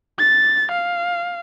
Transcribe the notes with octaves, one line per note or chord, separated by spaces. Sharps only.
A6
F5